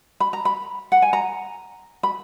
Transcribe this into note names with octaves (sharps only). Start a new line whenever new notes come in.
B5
A#5
B5
F#5
G#5
A#5
B5